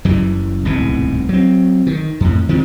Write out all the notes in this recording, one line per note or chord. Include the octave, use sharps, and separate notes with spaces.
F#1 F#2 E3 G3
D1 C2 G#2 B2
F#3 C4
D#3
F2 A2
D#3 F3 G#3 C4